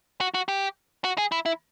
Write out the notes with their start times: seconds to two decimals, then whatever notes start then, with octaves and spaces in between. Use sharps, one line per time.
0.21 F#4
0.34 F#4
0.48 G4
1.04 F#4
1.18 G#4
1.32 E4
1.46 E4